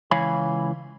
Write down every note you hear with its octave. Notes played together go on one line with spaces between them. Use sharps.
C#2 E3 C#5 F5 G#5 B5